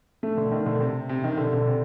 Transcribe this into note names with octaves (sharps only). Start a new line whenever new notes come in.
A3
D3
D#3
D3
C3
C3
D#3
D3
D3
C3